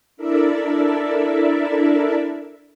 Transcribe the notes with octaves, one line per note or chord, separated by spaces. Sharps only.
D4 E4 A4 A#4 D5 E5